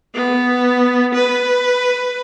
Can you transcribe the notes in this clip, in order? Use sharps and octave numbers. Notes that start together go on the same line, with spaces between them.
B3
B4